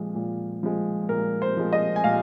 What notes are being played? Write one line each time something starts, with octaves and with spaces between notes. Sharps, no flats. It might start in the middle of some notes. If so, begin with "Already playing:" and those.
Already playing: A#2 F3 G#3
A#2
F3 G#3
A#2 A#4
C5
F3 G#3
D#5
G#5
A#2 F5